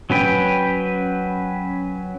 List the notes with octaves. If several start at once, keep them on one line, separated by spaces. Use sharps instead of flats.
F#3 C#4 B4 G5